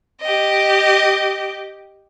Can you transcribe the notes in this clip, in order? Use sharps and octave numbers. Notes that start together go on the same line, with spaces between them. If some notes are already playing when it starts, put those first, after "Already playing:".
G4 D#5